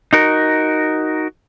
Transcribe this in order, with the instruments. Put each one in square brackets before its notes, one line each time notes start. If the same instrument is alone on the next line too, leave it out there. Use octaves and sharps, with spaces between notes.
[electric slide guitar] D#4 F#4 A#4